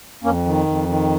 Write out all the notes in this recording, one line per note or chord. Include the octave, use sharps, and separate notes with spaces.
F2 A#3 C#4
D#3
F2
D#3